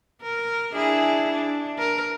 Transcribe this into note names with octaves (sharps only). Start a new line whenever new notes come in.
A#4
D4 E4 G#4
D4
A#4